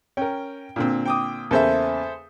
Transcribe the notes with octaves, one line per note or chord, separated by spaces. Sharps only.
C#4 A#4 G5
A#2 D3 C4
G5 D6 D#6
E2 C#3 A#3 A4 C5 E5